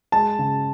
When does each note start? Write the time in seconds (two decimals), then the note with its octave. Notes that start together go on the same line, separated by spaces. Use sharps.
0.12 G#3 A5
0.39 C#3